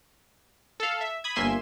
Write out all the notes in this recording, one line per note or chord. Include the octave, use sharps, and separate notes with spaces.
A4 F5
E5
B5 D#6 G#6
G1 A#3 E5 G#5 C6 E7